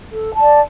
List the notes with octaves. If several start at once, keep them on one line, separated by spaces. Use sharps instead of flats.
A4
D5 A5